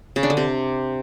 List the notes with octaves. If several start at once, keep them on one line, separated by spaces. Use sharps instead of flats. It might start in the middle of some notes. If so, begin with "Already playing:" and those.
C#3
D4
D3
C3